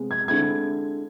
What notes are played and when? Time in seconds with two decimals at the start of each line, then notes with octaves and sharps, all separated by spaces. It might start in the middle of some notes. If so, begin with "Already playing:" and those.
Already playing: C3 G#3 B3
0.11 G#6
0.28 D3 G#3 C4 E4 G#6